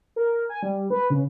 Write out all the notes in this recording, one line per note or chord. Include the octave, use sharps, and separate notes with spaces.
A#4
G#5
G3
B4
C#3